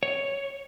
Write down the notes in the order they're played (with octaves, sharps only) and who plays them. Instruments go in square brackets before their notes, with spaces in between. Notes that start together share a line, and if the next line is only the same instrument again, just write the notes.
[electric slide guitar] C#5